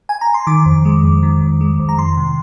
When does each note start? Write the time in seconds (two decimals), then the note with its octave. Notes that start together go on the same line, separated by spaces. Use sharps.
0.09 G#5
0.21 A#5
0.34 C6
0.47 D#3 D6
0.66 F2
0.85 G#3
1.03 F2
1.23 D#3
1.41 F2
1.61 G#3
1.79 F2
1.89 A#5
1.98 D#3 C6
2.17 C3